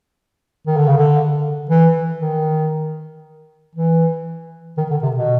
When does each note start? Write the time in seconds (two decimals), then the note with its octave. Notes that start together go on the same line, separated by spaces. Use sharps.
0.67 D#3
0.76 D3
0.87 C#3
0.97 D3
1.69 E3
2.20 D#3
3.75 E3
4.77 D#3
4.90 D3
5.03 C3
5.16 B2